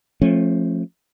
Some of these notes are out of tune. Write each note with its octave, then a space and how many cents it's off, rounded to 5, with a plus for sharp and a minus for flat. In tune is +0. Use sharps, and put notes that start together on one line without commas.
F3 +0 A3 +0 C#4 -30